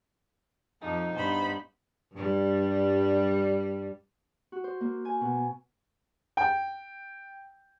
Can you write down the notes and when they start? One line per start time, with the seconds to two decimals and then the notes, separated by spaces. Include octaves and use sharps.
0.81 F2 F3 D#4
1.14 G2 B3 C5 B5
2.13 G2 G3
4.52 F#4
4.64 C5
4.81 A#3
5.05 G#5
5.21 B2
6.37 G5